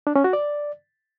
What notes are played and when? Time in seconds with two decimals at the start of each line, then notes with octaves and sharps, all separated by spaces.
0.07 D4
0.16 C#4
0.24 F#4
0.33 D5